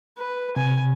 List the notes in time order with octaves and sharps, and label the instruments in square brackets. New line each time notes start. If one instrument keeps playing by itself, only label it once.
[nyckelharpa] B4
[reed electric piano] C3 [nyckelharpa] G#5